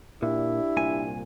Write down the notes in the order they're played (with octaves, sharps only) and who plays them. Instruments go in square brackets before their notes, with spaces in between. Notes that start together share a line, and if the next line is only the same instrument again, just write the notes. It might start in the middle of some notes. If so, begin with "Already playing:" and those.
[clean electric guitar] A#2 [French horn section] D4 G4 [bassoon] E4
[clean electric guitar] C2 A#2 G#5